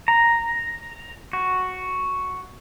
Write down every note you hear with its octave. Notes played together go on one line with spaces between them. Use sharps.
A#5
F#4